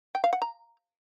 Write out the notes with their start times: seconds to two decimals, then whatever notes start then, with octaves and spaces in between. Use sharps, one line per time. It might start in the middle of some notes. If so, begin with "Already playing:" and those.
0.15 G5
0.24 F5
0.33 F#5
0.42 A#5